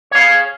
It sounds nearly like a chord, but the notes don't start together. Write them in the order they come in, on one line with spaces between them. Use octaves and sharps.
C#5 F5 G#4